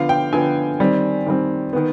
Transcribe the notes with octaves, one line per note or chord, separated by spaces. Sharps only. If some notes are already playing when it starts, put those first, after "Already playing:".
Already playing: D3 F3 B3 F5
G5
D3 F3 B3 G#5
D#3 G3 C4
D#3 G3 C4
D#3 B3